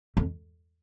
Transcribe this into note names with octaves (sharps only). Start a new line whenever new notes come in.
F2